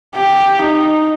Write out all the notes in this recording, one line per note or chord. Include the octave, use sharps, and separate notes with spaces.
G4
D#4